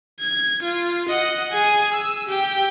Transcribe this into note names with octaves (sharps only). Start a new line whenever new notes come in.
G#6
F4
D#5 F#5
G#4 G#5
E6
G4 G5